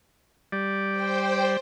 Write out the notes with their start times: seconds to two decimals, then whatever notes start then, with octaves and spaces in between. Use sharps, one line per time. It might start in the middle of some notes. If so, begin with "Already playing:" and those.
0.52 G3 D5
0.90 C5 G5